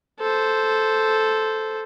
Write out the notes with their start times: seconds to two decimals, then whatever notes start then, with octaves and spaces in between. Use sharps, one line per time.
0.20 A4 C5